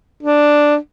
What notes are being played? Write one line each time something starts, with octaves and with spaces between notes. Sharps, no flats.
D4